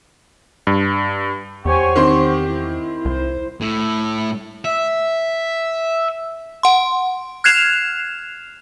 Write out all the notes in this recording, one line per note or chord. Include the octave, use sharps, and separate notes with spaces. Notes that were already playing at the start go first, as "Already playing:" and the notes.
G2
E2 G4 C5 C#5 F#5 G#5 C#6
D#3 C4 G4 C6
E4
C2 C5
A2
E5
F#5 C6
F6 F#6 G#6 C7 E7 F7